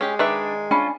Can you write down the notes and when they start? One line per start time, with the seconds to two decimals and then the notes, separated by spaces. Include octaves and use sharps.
0.01 G#3 C#4 G4
0.19 D#3 D4 B4 E5
0.71 C#4 D4 F4 G#5 B5